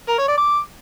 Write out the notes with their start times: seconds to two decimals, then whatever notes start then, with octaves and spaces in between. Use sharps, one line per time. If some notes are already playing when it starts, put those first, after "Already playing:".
0.08 A#4
0.18 C#5
0.28 D5
0.38 D6